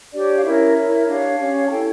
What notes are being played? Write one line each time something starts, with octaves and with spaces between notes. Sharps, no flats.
D4 G4 C#5 D5
F5
C#4 E4 A#4 C#5 E5
E4 A#4 C#5
D4 G4 C#5 F5
C#4 G4 C#5
A5
E4 A4 C#5 G5